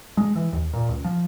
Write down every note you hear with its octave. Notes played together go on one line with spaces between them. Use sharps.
G#3
E3
D#2
A#2
C#2
F3